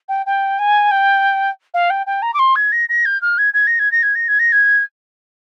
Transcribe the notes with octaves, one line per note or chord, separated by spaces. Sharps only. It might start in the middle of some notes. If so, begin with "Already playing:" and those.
G5
G5
G#5
G5
F5
G5
G5
A#5
D6
C6
G#6
A#6
A#6
G6
F6
G#6
G#6
A#6
G#6
A#6
G#6
A#6
G#6
A#6
G#6